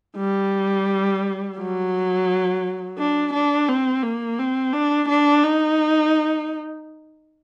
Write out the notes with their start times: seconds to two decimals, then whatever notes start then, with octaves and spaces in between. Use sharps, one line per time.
0.17 G3
1.58 F#3
2.98 D4
3.34 D4
3.69 C4
4.03 A#3
4.39 C4
4.73 D4
5.09 D4
5.44 D#4